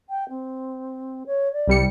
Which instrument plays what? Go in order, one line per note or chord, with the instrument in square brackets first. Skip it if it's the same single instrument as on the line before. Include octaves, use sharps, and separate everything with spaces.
[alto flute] G5
C4
C#5
D5
[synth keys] C2 G3 C#7